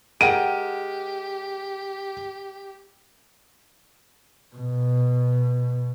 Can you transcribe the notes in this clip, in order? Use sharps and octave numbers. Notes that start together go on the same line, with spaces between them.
G#3 G4 A#4 F#5 G5 D#7
B2